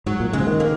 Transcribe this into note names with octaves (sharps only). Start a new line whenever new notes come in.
G#2 F#3
A#2
C#3 G#3
F3
D#3
A#3